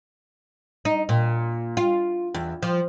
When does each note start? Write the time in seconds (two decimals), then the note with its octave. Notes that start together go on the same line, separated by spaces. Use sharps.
0.85 D#4
1.09 A#2
1.77 F4
2.34 E2
2.63 F3